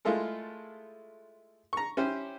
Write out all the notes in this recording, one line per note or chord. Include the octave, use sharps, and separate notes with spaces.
G#3 A3 E4 F4 A4 A#4
A#5 C#6
C#4 E4 G4 C5